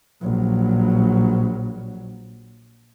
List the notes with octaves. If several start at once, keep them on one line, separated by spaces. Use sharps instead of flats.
A#1 F#3